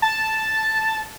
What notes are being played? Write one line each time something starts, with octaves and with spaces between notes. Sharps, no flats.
A5